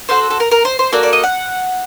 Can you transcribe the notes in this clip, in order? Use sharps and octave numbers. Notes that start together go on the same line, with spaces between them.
C4 F#4 A4 C5
A4
A#4
A#4
C5
C5
A#3 F#4 A4 D5
D5
D#5
F#5